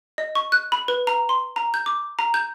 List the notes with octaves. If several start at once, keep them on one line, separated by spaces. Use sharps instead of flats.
D#5
C#6
F#6
B5
B4
A#5
C6
A#5
G6
D6
A#5
G6